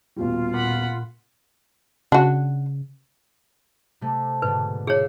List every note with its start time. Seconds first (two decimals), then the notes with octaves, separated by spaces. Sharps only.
0.16 D#1 B2 G3 F4
0.54 A#2 F#5 B5
2.12 C#3 D4 F#4
4.01 C3 A3
4.42 G#2 B2 D3 B4
4.87 F4 G#4 C#5 E5 F5